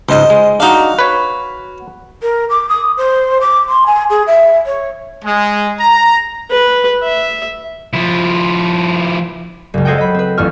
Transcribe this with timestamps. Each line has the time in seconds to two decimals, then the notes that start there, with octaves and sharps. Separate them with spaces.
0.09 C#2 G#2 C5 D#5
0.30 G#3
0.60 D4 D#4 F#4 F5
0.99 B4 C#5
2.22 A#4
2.49 D6
2.69 D#6
2.97 C5
3.41 D6
3.69 C6
3.86 G#5
4.10 G#4
4.27 E5
4.66 C#5
5.25 G#3
5.80 A#5
6.51 B4
7.03 E5
7.94 F3 E4
9.74 F#1 C#2
9.85 A4 C5 C#5 D#5 F#5 G5
9.98 D#5 B5
10.14 C4 B4
10.37 A1 F2 D4 C#6 F6